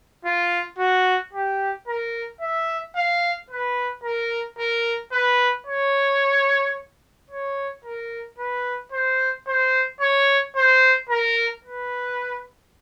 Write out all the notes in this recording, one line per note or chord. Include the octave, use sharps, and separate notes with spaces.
F4
F#4
G4
A#4
E5
F5
B4
A#4
A#4
B4
C#5
C#5
A#4
B4
C5
C5
C#5
C5
A#4
B4